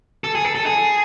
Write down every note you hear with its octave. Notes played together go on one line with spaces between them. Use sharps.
A4
G#4
A4
A4
G#4